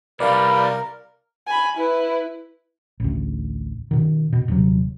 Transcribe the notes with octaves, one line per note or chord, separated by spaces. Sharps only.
C2 G3 A#4 B4 D5 F5 D6
G#5 B5
E4 B4
A1 D2
B2 D#3
B2
D#1 C3 F#3